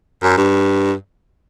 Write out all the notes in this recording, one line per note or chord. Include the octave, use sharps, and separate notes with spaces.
F#2
G2